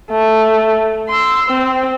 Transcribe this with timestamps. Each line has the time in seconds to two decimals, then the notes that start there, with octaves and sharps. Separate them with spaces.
0.11 A3
1.09 C6 E6
1.49 C4